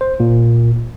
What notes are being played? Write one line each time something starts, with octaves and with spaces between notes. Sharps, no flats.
C5
A#2